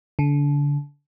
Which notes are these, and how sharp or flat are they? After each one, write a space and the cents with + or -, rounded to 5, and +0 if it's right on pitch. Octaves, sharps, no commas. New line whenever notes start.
D3 -30